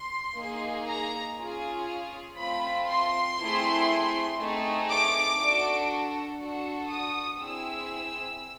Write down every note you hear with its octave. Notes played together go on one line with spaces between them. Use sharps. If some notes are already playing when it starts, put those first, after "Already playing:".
Already playing: C6
A#3 D#4 G#4
A#5
C#4 F4 G#4
A3 C4 F4 B5
C6
A3 C4 E4 G#4
A3 C4 D#4 G#4
D6
D4 F#4 A4
D4 F#4 A4
D#6
C4 E4 G#4 E6